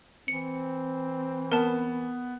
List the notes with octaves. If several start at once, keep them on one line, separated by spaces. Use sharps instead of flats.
E3 C4 C#7
B3 A#4 A5